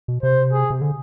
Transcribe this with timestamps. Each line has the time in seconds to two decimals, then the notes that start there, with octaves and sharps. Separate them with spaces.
0.08 B2
0.22 C3 C5
0.52 G#4
0.70 C3
0.81 D3